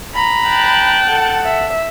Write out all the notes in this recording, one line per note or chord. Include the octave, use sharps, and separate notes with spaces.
A#5 B5
G5 A5 F#6
A4 F#5
E5